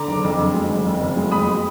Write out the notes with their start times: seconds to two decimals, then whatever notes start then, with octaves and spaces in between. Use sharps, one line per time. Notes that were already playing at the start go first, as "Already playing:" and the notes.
Already playing: D3 A#5 D6
0.08 F#1
0.24 F2
0.39 D3
0.54 G#3
0.70 F#1
0.86 F2
1.01 F#1
1.17 G#3
1.31 F2 B5 D#6
1.47 G#3